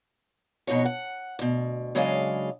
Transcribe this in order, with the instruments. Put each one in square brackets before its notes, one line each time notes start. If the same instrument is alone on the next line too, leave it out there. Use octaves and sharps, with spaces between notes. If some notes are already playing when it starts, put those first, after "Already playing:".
[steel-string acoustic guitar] F2 B2 D#4 F#4 C#5
F#5
D2 B2
C#3 F#3 G#3 D4 D#5 F5